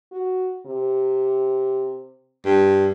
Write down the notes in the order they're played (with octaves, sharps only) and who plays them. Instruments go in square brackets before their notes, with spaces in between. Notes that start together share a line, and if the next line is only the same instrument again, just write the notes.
[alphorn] F#4
C3
[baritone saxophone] G2